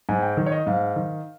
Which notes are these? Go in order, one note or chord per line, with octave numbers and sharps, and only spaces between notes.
G#2 G#5
G5
D#3
C#5
D#5
G#2 F5
D#3